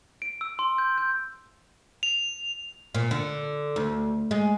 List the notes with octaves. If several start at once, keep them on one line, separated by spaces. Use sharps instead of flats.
D7
E6
C6
G6
G6
F7
A#2
D3
D2
G#3